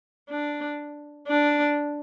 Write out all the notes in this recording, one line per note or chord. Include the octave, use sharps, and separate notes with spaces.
D4
D4